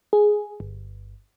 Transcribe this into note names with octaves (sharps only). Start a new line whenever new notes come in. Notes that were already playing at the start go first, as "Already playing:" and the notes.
G#4
G1